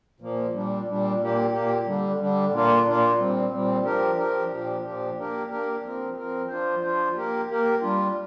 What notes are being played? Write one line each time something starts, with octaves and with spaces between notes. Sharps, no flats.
A#2 F3 A#3
A#2 G3 D4
A#2 G3 D4
A#2 A#3 G4
A#2 A#3 G4
D3 G3 D4
D3 G3 D4
A#2 A#3 D4 F4
A#2 A#3 D4 F4
A#2 G3 C4
A#2 G3 C4
F3 D4 G4 A#4
F3 D4 G4 A#4
A#2 F3 D4 G4
A#2 F3 D4 G4
A#3 D4 G4 A#4
A#3 D4 G4 A#4
F3 C4 A#4
F3 C4 A#4
F3 D4 F4 C5
F3 D4 F4 C5
A#3 G4 A#4
A#3 G4 A#4
G3 D4 F4